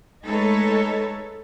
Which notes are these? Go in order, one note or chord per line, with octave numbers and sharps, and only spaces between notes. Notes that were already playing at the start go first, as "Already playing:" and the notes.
G#3 A3 D#4 A4 B4 C#5